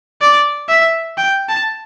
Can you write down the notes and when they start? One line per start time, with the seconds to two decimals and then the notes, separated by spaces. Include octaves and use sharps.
0.21 D5
0.69 E5
1.17 G5
1.49 A5